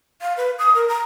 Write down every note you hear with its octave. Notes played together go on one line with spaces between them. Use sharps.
F5
B4
D#6
A#4
A#5